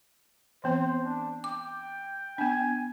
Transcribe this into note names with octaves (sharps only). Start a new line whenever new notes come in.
E3 B3 C4 C5
D4
G5 D6
B3 D4 G#5